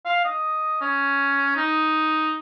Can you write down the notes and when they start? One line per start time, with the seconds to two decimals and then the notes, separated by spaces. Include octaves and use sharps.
0.06 F5
0.25 D#5
0.81 C#4
1.56 D#4